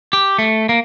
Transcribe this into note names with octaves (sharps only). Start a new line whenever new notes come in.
G4
A3
A#3